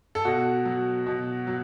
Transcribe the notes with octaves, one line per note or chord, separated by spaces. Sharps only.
A4
B2 F#4
F#3
B2
F#3